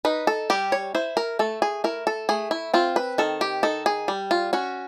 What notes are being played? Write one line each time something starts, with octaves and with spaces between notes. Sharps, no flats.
D#4 B4
A4
G3 G4
C#5
E4 C5
A#4
A3 A4
G#4
E4 A#4
A4
A3 G#4
E4
C4 F4
B4
D#3 A4
G4
D#4 A4
G#4
G3
F4
C#4 F#4